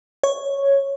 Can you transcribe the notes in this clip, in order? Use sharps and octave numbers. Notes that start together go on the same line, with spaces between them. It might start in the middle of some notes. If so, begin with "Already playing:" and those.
C#5